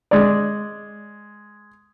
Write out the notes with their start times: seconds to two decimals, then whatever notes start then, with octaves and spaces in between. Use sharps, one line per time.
0.11 G#3 D5